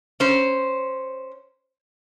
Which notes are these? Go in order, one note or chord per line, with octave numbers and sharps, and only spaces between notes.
C#4 C5